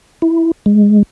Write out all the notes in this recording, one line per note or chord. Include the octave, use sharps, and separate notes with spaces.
E4
G#3